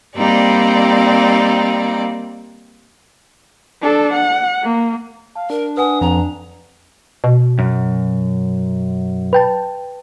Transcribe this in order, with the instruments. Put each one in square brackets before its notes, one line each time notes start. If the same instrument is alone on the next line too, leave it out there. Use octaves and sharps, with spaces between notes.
[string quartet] G3 A#3 C4 D#4 D5
[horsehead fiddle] D4 A4
F#5
A#3
[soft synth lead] F5 [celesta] A5
[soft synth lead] D4 [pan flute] A#4
[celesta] B4 F#5 G#5 [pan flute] D#6
[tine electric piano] F2 [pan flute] A#5
[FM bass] B2
[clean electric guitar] F#2
[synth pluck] B4 G5 A5